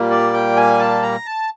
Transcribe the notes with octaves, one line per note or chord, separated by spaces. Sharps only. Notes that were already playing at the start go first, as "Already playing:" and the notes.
Already playing: A#2 G3 A#3
D5
G5
G#5
A5
A#5
A5